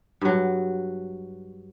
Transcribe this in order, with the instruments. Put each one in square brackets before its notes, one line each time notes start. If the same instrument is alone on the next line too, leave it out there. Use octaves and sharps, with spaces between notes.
[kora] G2 F#3